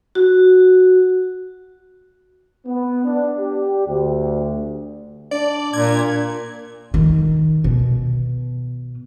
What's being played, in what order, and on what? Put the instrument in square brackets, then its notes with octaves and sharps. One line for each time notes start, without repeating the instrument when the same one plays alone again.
[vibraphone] F#4
[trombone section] B3
D4
G4
D2
[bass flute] D4 [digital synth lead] D5
[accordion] A#2 [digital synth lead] G#6
[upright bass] D#3
B2